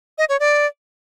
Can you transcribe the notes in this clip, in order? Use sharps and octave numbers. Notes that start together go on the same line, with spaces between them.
D#5
C#5
D5